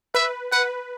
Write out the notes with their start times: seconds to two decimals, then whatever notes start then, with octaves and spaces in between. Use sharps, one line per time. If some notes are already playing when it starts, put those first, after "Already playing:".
0.15 B4 E5
0.52 B4 F#5